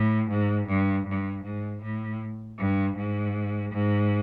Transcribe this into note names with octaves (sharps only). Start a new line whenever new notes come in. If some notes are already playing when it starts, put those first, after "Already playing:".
Already playing: A2
G#2
G2
G2
G#2
A2
G2
G#2
G#2